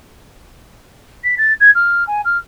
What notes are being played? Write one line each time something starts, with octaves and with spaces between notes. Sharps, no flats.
B6
A6
G#6
F6
G#5
F6